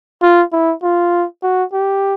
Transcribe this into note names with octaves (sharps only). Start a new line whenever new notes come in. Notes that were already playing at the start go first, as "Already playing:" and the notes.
F4
E4
F4
F#4
G4